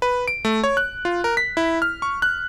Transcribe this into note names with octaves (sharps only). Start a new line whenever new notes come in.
B4
D7
A3
C#5
F#6
F4
A#4
B6
E4
F6
C#6
F#6